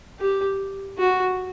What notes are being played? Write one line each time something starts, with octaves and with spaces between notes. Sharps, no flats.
G4
F#4